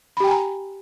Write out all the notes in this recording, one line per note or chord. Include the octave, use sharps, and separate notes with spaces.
G4 G5 G#5 A#5 B5